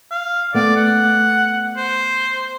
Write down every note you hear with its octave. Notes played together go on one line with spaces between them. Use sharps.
F5
A3 B3 D5
F#5
C5